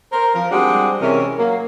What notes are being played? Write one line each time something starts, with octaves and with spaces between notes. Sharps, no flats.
A#4 C5
F3 A#4
G3 G#3 C4 D4 F#4 G4
C3 E3 G#3 C#4 A#4
F#3 A#3